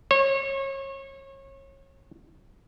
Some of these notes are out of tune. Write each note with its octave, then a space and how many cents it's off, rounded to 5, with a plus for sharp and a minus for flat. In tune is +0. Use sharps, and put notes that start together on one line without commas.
C#5 -30